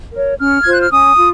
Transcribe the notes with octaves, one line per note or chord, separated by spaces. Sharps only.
A#4 C#5
C#4 F6
F4 C5 G#6
F#6
F6
C#4 D#6
F4